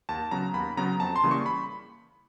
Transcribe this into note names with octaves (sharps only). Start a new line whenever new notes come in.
D#2 A5
C#3 F#3 B3 A#5
D#2 B5
C#3 F#3 B3 A#5
F2 A5
C6
C#3 E3 G3 A#3
C#6
B5